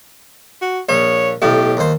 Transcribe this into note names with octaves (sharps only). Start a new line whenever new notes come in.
F#4
A#1 C#5
B1 A2 G4
D#2 C5